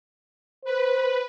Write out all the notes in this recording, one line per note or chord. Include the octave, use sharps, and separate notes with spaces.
B4 C5